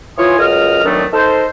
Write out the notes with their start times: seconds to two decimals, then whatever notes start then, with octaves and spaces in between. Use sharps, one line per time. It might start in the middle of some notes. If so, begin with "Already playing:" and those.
0.18 E3 F4 C#5 G#5 C6 D#6
0.38 C#2 F#2 D#5 F6
0.84 D2 D#3 F#3 A3 B3 D4
1.13 D#4 A4 A#4 C5